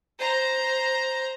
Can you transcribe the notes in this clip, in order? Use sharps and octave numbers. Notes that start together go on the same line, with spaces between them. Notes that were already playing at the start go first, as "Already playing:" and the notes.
C5 A#5